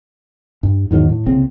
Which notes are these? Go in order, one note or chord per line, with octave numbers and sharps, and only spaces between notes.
G2
E2 G#2 D#3 F#3
A2
C2 C#3 A#3 C4